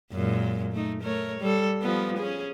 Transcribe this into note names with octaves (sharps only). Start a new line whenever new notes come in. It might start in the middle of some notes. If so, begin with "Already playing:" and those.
F#2 A#2 G#3
A3 D#4
A3 A#4 C#5
G3 A4
F3 G3 B3
C#4 G#4